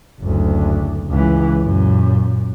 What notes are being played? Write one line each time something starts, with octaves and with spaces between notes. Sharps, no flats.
F#1 D2
C#2 E3
F#2 A#2